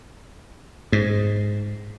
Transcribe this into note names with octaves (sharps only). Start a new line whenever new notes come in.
G#2